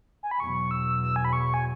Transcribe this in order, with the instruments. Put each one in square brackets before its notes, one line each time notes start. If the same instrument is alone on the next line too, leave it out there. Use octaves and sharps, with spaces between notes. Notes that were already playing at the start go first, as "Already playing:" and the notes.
[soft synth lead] G#5
B5
[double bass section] E2 B2 F#3 [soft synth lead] C#6
[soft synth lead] E6
E6
G#5
B5
C#6
G#5